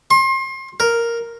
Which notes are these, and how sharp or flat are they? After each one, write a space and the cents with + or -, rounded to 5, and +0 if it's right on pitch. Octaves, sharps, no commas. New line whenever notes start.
C6 +35
A#4 +0